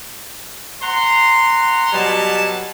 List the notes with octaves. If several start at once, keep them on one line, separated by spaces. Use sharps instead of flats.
F#5 A#5 C6
B2 F#3 G3 G#5 A5